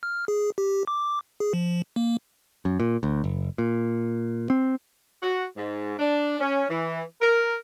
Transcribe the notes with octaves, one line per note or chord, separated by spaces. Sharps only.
F6
G#4
G4
D6
G#4
F3
A#3
F#2
A#2
D2
F#1
A#2
C4
F#4
G#2
D4
C#4
E3
A#4